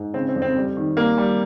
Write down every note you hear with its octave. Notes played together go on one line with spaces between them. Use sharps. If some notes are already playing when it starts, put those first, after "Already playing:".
Already playing: G#2
C#3 C4
C4
F2
C4
G3
D#3
G3 A#3
G3